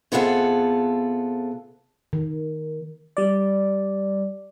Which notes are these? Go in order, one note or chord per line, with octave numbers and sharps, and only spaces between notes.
C3 B3 F4 G#4 A4 F#5
D#3
G3 D5